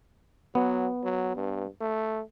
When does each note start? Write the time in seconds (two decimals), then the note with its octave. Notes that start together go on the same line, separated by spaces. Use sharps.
0.55 F#3 B3
1.03 F#3
1.36 G2
1.81 A3